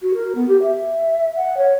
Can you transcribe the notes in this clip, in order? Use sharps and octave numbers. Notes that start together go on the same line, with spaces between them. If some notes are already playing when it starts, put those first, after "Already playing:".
F#4
A#4
B3
G4
E5
F#5
C#5